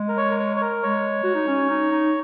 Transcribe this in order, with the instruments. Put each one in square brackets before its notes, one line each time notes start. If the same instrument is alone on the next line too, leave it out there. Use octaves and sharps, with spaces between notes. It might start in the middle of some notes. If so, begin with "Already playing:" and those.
Already playing: [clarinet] G#3
[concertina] A#4
C#5
A#4
C#5
C#5
A#4
[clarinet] G#3 [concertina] C#5
[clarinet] F#4
D#4
C#4
D#4
D#4